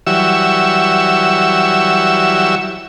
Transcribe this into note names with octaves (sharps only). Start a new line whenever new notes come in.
E3 F#3 G3 E5 C#6 E6